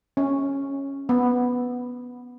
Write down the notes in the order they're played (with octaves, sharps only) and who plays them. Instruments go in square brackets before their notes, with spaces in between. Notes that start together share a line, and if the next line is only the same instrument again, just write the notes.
[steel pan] C#4
B3